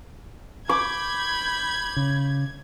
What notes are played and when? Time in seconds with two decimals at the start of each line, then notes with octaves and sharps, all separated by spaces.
0.69 B5 D6 G6 G#6
1.96 C#3